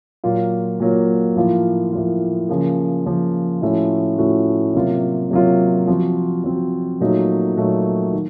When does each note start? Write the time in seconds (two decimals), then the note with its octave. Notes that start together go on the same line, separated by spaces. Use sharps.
0.24 A#2 F#3 A#3 F4
0.80 A#2 F#3 A#3 F4
1.36 A2 F3 A#3 F4
1.92 A2 F3 A#3 F4
2.49 C#3 F3 A#3
3.05 C#3 F3 A#3
3.62 A2 F3 A3 C#4 F#4
4.18 A2 F3 A3 C#4 F#4
4.74 C3 F#3 A#3 F4
5.31 C3 F#3 A#3 F4
5.87 F3 C4 F#4
6.44 F3 C4 F#4
7.01 A#2 F#3 A3 D#4 F#4
7.57 A#2 F#3 A3 D#4 F#4
8.13 D#3